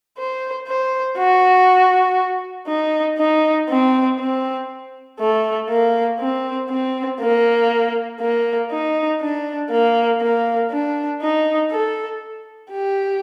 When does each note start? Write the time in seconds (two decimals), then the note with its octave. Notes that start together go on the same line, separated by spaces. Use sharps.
0.18 C5
0.67 C5
1.18 F#4
2.68 D#4
3.18 D#4
3.69 C4
4.19 C4
5.20 A3
5.69 A#3
6.20 C4
6.69 C4
7.20 A#3
8.20 A#3
8.71 D#4
9.21 D4
9.70 A#3
10.21 A#3
10.71 D4
11.22 D#4
11.71 A4
12.71 G4